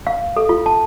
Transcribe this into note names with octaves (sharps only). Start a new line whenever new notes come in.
F5
A4
F4
A5